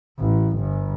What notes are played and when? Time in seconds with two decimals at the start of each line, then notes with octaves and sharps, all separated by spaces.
0.19 A1
0.58 G1